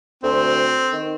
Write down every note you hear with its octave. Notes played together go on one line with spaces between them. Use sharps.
D2 C4
D#3